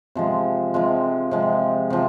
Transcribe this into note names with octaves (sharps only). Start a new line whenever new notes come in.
C3 F3 G#3
C3 F3 G#3
C3 F3 G#3
C3 F3